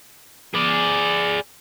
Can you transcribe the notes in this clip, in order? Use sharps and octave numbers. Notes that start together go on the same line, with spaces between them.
G#4 D5